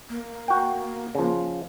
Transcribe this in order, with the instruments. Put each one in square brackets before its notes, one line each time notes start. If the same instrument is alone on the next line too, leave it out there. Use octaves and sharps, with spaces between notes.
[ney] A#3
[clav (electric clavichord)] F#4 G5
C#3 F3